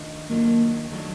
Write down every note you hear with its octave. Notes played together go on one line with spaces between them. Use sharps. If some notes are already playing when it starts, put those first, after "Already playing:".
Already playing: D#3 A3 D4 F4
D#3 F#3 A3 A#3 D4 F4
D#3 F#3 A3 D4 F4